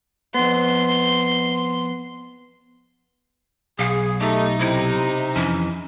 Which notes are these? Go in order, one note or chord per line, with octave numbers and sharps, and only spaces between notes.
F2 B3 C6
B1 G#4 F5
A3 D#4 G4
C3 E4
F2 E3 C#4